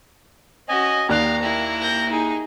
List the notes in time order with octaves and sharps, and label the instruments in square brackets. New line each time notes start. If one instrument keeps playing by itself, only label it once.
[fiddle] C#4 F#4 [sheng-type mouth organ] D#5 G#5
[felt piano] D#2 D5 F#6 [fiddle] G4 F5 [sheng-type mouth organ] A#5
[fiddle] A#3 E4
[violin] G6 A#6
D#4 G#4